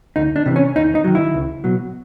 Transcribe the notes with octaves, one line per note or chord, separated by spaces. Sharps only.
D2 D#4
D4
C3 E3
C#4
D#2 D#4
D#4
D#3 F#3
E4
C#2
B2 F#3